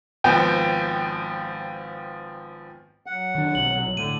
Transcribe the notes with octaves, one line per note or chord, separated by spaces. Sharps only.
G#1 F3 B3 G5
F#3 F#5
D#3 D4
B1 C3 F#7
A2 D3 D#7